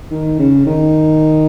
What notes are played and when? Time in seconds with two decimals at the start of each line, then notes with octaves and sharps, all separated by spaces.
0.11 D#3
0.39 C#3
0.66 D#3